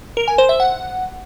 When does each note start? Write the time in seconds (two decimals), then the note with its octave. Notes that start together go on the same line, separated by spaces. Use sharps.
0.17 A#4
0.28 G#5
0.38 C5
0.49 E5
0.60 F#5